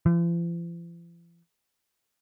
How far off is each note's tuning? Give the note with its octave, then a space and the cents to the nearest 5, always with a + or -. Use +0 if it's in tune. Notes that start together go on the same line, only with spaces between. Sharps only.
F3 -45